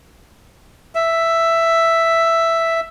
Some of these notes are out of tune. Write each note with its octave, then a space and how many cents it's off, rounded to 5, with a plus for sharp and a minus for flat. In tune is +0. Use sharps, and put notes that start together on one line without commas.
E5 +5